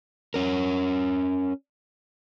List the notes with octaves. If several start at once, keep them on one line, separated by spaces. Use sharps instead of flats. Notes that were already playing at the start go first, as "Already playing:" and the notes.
C#4 A#4